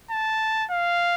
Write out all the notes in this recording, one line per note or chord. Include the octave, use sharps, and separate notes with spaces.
A5
F5